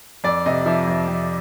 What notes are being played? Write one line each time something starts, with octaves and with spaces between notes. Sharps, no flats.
F2 D5
C3 D#5
F3 E5
F2
F2